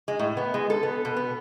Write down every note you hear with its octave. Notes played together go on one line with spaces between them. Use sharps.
G#3
A2
B3
G#3
A4
B3
B2
B3